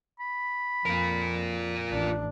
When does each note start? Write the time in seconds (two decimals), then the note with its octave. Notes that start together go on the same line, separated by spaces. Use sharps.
0.20 B5
0.86 F2 F4 A#4
1.88 A1 D4